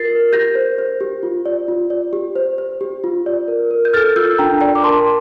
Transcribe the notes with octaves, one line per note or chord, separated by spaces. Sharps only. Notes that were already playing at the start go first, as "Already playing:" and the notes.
Already playing: F4 A#4 A6 C7
A#4
G4 G6 A#6
C5
C5
G4
F4
D5
F4
D5
G4
C5
C5
G4
F4
D5
A#4
A#4
G6
A4 F6 A6
F4 E6 G6
D4 G5 A#5
D5 G5 A#5
D6
A#4 A5 C6